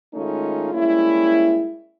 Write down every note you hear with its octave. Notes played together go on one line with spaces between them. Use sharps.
D#3 G#3 A3 C#4 D#4 F4
G3 G#3 A#3 C#4 E4